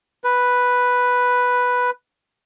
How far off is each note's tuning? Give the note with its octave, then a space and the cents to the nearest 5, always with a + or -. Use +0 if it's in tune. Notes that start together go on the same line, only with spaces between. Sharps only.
B4 +0